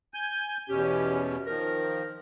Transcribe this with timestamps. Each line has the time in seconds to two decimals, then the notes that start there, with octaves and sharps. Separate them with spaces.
0.14 G#5 G6
0.69 E2 B2 C#4 G4
1.47 D#3 F3 A#4